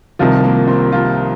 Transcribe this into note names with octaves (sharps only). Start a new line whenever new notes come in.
C2 C3 D#3 F3 F4
A#3
C4
F3 F4